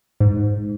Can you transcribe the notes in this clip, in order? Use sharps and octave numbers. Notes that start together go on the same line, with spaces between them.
G#2